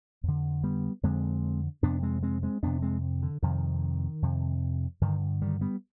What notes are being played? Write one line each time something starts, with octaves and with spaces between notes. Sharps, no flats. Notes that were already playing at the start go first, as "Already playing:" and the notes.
F2 D3
G3 B3
F2 D3 G#3 C4
F2 C3 B3 D4
G#3 C4
G#3 C4
G#3 C4
F2 C3 B3 D4
G#3 C4
D3
F2 C3 D#3
F2 C3
G2 D3 D#3
D#3 G3
G3 B3